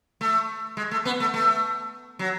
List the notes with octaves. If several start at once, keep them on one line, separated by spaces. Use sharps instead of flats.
A3
G#3
A3
B3
A3
A3
F#3